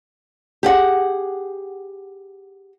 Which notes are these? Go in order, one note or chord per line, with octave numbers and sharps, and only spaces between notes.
G4 G#4 F#5